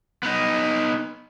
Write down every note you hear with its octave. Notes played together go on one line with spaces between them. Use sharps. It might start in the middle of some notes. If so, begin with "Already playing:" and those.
B3 D#4